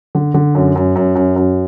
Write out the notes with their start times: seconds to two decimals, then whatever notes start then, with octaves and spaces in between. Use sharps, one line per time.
0.15 D3
0.34 D3
0.55 F#2
0.76 F#2
0.96 F#2
1.15 F#2
1.36 F#2